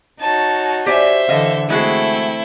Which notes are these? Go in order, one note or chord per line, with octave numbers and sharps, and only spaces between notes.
D#4 F#4 C#5 A5
G4 C5 D5 E5 G#5
D3 E3 A4 D#5 F5
G#3 A3 C4 E4 F#4 G#4 A4